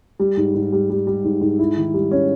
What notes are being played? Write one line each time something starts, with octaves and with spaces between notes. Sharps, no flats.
G3
G#2
G#2
G3
G3
G3
G#2
G#2
E4
D#3
G3
C#4